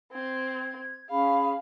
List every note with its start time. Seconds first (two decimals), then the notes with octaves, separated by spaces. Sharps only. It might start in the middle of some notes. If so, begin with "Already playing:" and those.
0.12 C4 G#6
1.10 C#4 G#4 F5 B5